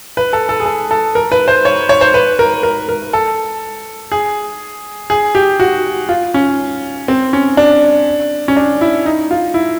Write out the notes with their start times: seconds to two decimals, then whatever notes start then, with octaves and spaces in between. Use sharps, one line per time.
0.17 B4
0.33 A4
0.49 A4
0.60 G#4
0.66 A4
0.91 A4
1.15 A#4
1.32 B4
1.48 C5
1.65 C#5
1.89 C#5
2.01 C5
2.14 B4
2.39 A#4
2.63 A#4
2.89 A#4
3.13 A4
4.12 G#4
5.10 G#4
5.35 G4
5.60 F#4
6.09 F4
6.34 C#4
7.08 C4
7.33 C#4
7.57 D4
8.48 C#4
8.57 D4
8.81 E4
9.06 D#4
9.31 F4
9.54 E4